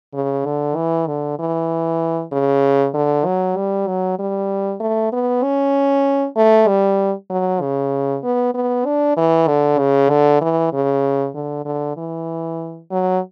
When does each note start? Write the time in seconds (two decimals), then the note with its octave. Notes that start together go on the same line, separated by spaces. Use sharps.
0.14 C#3
0.45 D3
0.76 E3
1.07 D3
1.39 E3
2.32 C#3
2.94 D3
3.26 F#3
3.57 G3
3.87 F#3
4.19 G3
4.80 A3
5.12 B3
5.43 C#4
6.37 A3
6.68 G3
7.30 F#3
7.61 C#3
8.23 B3
8.55 B3
8.85 D4
9.17 E3
9.47 D3
9.79 C#3
10.10 D3
10.41 E3
10.73 C#3
11.35 D3
11.65 D3
11.97 E3
12.91 F#3